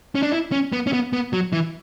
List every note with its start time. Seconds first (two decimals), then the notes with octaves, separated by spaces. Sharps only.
0.15 C#4
0.23 D4
0.32 E4
0.52 C#4
0.72 B3
0.87 C#4
0.93 B3
1.13 B3
1.33 F#3
1.53 E3